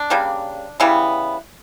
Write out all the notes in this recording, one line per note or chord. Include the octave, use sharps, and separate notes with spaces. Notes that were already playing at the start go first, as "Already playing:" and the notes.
Already playing: D4
C#3 G3 A#3
C#3 E3 G3 B3